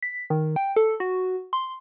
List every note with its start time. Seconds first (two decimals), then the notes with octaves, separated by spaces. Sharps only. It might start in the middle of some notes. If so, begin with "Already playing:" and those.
0.03 B6
0.30 D#3
0.56 G5
0.76 A4
1.00 F#4
1.53 C6